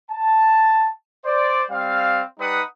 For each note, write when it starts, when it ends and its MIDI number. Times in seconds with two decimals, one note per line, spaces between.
0.11 0.89 81
1.25 1.63 72
1.25 1.63 74
1.71 2.22 55
1.71 2.22 60
1.71 2.22 77
2.39 2.62 55
2.39 2.62 63
2.39 2.62 71
2.39 2.62 78
2.39 2.62 87